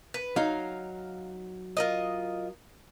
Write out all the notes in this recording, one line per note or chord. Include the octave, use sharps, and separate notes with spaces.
B4
F#3 D#4 F5
F4 A#4 D#5